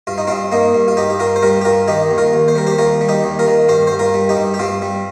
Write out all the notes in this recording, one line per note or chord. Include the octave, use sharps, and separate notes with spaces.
G2 F4
D#4
G2 C4 F4
G2 A#3 D#4
G2
F4
G2 D#4 G4
G4
G2 F4 A#4
C5
G3 F4 A#4
G4
G2 F4 A#4
D#3 D#4 G4
D#2
F4 A#4
D#2
C5
G3 A#4
G4 C5
D#2 F4 A#4
G3
D#4 G4
D#2
F4 A#4
D#3
G2 G4 C5
G2 C5
F4 A#4
G3
D#4 G4
G2
G4
G2 C4 F4
G3